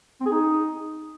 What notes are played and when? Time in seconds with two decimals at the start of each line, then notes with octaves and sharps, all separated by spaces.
0.21 C4
0.26 G#4
0.31 D#4